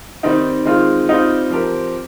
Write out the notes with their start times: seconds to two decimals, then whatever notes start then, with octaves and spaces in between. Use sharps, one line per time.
0.23 D#3 G3 C4 D#4
0.65 D#3 G#3 C4 F4
1.08 G3 C4 D#4 F4
1.50 F3 C4 G4 A#4